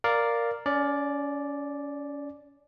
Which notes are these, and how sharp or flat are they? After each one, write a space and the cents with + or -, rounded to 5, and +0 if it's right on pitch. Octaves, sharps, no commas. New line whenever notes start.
A#4 +0 D5 +0 F5 +0
C#4 +30 D5 +0